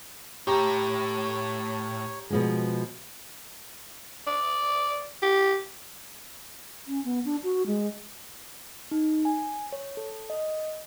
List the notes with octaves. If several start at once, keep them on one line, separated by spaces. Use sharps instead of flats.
A2 G4 C#5 A#5
B2 F3 G#3
D5
G4
C#4
B3
D4
F#4
G#3
D#4
G#5
C#5
A4
D#5